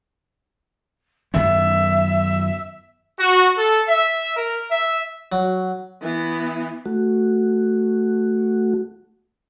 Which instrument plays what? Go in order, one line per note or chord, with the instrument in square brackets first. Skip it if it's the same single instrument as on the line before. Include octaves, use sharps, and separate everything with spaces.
[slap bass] F#2 D#3 B3 [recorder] E5
[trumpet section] F#4
A4
E5
A#4
E5
[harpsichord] F#3
[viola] E3 B3
[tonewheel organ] A3 F#4